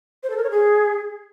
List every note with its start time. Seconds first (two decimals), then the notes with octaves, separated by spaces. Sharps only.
0.23 C5
0.30 A4
0.37 A#4
0.43 C#5
0.50 G#4